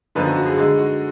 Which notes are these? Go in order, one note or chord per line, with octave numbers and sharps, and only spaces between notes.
F#2 D3 F3 B3 D#4 B4
F#4
F#4
G#4
D3 G#3 D#4 G#4
F#4